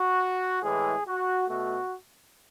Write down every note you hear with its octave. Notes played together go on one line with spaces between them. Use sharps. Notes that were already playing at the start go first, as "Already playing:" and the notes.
Already playing: F#4
A2 E3 G#3 G#4
F#4
B2 A3 F#4